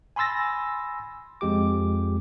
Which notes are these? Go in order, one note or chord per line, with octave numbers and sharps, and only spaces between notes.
G#5 B5 C6 E6 A6 A#6
F2 G#3 G4 D6